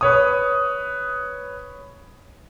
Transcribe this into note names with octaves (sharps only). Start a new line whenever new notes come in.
B4 C#5 D#6